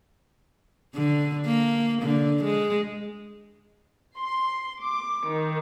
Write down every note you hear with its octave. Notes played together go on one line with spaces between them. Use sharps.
D3
A#3
D3
G#3
C6
D6
D#3